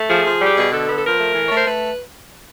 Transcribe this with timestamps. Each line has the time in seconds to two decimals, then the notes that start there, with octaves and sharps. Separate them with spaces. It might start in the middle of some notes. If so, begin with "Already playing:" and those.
Already playing: A3
0.08 F3 G#4
0.25 F3
0.40 G3
0.46 G4
0.56 B2 G#4
0.72 D3 A4
0.88 B3
0.97 A4
1.03 F3 A#4
1.20 A3
1.35 E3
1.47 A3 C#5
1.57 C5
1.66 A3 B4